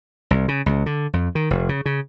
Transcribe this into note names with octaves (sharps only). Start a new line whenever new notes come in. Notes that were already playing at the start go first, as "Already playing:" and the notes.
C2
C#3
C#2
D3
F2
D#3
F1
C#3
C#3